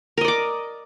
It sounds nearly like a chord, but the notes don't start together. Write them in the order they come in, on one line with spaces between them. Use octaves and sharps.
A#4 D#5 D5 D6